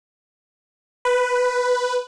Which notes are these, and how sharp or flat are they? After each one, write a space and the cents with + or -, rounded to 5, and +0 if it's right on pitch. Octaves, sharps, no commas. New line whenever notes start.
B4 +5